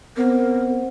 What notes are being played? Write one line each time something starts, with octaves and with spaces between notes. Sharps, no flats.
B3 C4 A#4 C5 F#5